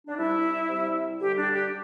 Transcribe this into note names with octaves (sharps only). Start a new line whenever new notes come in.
D4
C3 G3 E4
C3 G3
D3 G3 G4
D4
G4